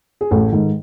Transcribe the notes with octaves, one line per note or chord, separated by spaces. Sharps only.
G#4
A1 A4
G#2 D#3